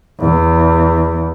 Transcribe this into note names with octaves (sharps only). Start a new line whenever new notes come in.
E2